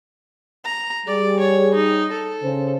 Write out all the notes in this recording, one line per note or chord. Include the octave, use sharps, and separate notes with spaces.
A#5
G3 G#4 D5
C#5
D#4
A4
C#3 C5